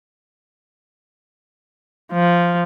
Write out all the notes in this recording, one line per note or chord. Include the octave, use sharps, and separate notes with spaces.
F3